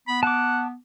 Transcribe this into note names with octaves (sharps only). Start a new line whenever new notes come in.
B3 B5
F#5 A5 D6